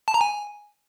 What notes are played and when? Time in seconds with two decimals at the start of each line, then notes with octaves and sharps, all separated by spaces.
0.08 A5
0.14 A#5
0.21 G#5